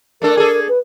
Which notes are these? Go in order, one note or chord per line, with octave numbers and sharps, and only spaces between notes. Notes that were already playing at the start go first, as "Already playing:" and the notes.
A3 D4 A4 A#4
G#4 A4
B4